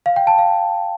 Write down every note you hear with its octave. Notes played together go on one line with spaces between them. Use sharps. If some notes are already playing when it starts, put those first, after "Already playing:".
F5
G5
A5
F5